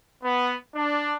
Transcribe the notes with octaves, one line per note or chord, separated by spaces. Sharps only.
B3
D4